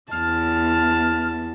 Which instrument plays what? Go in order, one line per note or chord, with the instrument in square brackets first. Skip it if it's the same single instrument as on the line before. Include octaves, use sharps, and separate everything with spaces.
[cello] E2 [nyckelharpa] A5 [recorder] F6